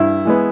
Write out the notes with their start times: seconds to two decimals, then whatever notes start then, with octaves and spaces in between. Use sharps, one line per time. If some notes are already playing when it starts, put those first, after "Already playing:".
Already playing: G2 E4 E5
0.25 E3 G#3 B3